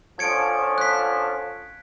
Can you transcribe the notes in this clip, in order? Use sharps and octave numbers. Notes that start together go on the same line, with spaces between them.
D3 F3 C#4 G#6 C#7 D7
F#6 B6